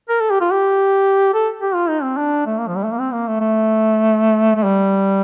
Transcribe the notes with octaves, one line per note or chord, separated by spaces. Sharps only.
A#4
A4
G4
F4
G4
A4
G4
F4
D#4
C4
D4
A3
A#3
F3
G3
A3
A#3
C4
A#3
A3
A3
A3
G3